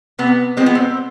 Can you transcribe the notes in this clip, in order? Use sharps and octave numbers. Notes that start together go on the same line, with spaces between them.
C3 B3
F3 G#3 C4
B3
C4